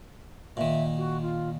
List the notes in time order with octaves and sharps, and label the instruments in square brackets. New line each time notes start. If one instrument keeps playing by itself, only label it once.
[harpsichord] A#2 D#3 [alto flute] E5
[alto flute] F#4
F4